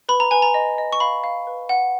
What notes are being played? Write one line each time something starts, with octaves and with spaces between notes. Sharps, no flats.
B4 B5
A#5
B4 G#5
A#5
D#5
D#5
C#6
F5 B5
F5
B4
F#5